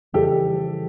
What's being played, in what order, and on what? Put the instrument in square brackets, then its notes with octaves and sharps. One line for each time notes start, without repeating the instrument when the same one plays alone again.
[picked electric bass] F2 C#3 E3 G3 [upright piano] G4 A4